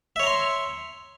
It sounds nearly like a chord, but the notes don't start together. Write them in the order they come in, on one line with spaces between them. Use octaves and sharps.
E5 C#5 A#5 C6